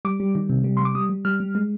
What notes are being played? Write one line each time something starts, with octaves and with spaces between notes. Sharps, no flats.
G3 D6
G3
D#3
C3
G3
G3 C6
D6
G3 D#6
G3
G3 F6
G3
G#3